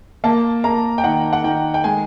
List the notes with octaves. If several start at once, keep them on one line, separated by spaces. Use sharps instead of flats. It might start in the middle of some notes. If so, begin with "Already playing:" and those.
A#3 A5
A#3 A#5
G5
D#3 F#5
F#5
D#3 G5
G5
G#3 G#5